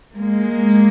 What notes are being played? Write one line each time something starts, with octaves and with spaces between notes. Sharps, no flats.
G#3 A#3